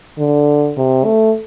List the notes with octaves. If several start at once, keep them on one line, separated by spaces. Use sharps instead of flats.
D3
C3
A3